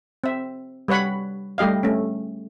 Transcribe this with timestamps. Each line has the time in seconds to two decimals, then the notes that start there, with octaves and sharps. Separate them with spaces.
0.24 C4 E5
0.88 G3 B4 C#5 F#5 B5
1.58 G3 A3 G4 D#5 F5
1.83 A3 C#4